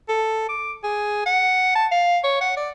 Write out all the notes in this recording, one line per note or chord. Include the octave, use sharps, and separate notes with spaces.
A4
D6
G#4
F#5
A5
F5
C#5
F#5
D5